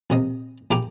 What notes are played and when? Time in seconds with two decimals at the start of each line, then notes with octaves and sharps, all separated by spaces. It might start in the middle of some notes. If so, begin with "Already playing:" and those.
0.10 A#1 C3 D#5
0.71 A#1 E4 G4 G#5 A#5 D6